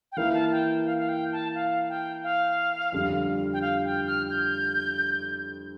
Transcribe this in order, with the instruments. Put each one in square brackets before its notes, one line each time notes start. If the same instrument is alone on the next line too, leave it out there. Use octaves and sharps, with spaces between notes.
[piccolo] G5
[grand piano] E3 A#3 E4 [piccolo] F5
[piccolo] A5
G5
F5
F5
G5
A5
F5
G5
F5
[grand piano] F2 D3 G3
[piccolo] G5
F5
G5
F6
G6